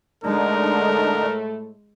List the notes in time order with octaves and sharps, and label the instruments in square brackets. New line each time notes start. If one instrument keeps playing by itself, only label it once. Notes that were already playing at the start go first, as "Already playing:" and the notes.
[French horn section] A2 A3 [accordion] D3 D4 D#4 [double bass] G#3 [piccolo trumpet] A#4